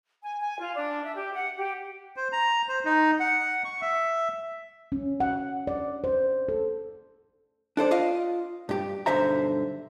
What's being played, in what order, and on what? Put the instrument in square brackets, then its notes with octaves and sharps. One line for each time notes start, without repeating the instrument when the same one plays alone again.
[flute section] G#5
G#5
F4
D4
E5
G4
F#5
G4
[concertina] C5
A#5
C5
D#4
F#5
C#6
E5
[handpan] C#4
F#5
D5
C5
A4
[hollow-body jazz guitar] D4 A4 C5 D5
F4 D#5 F5
G2 G4
B1 G2 D3 C5 E5 A#5